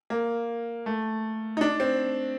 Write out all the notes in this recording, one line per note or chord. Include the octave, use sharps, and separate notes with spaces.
A#3
A3
D#4
D4
C4